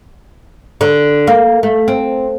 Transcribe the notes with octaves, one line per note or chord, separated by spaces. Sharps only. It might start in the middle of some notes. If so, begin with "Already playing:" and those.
D3
A#3
A3
C4